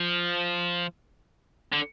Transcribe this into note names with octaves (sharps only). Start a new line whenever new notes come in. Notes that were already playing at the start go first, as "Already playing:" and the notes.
Already playing: F3
D3